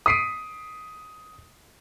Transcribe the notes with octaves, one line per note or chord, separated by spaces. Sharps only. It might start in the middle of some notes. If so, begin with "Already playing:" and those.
D#6 B6 C7 D7 D#7